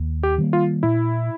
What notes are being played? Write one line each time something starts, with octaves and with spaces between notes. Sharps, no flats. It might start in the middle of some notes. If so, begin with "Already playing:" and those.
Already playing: D#2
G4
D#3 G3 A#3
F4
A#2 E4